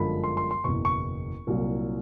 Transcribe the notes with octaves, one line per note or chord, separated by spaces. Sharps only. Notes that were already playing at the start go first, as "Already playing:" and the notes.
Already playing: G1 F#2 D3 F3 G#3 B5
C6
C6
C6
F#1 E2 B2 C#6
C#6
C2 A#2 F#3